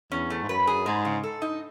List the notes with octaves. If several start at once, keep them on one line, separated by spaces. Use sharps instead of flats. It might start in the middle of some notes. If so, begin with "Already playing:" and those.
E2 C#4
A3
G#2
F#2 B4
G#4
G#2 G#3
C#3
A4
D#4